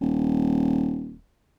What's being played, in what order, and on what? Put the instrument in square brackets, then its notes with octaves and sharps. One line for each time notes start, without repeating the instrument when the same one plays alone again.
[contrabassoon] D#1